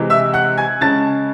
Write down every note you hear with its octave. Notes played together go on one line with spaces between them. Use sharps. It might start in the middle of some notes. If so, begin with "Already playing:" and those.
Already playing: C3 E3 G#3
E5 E6
F#5 F#6
G#5 G#6
C#3 G#3 C#4 A5 A6